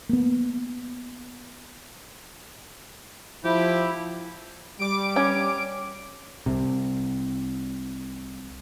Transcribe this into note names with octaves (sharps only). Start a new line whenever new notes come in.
A#3 B3
F3 E4 G4
G3 D6 D7
C#4
C2 C3